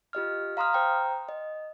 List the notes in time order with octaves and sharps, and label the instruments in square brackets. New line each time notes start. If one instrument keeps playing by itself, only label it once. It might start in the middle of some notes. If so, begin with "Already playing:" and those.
[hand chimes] F4 G4 D#5 F6
F5 A#5 C6 D#6 F6
C5 G5 A#5
D#5